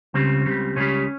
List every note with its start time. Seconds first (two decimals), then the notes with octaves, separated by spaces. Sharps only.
0.14 C#2 C#3 G3 C4
0.46 C#2 C#3 G3
0.76 C#2 C#3 G3 C#4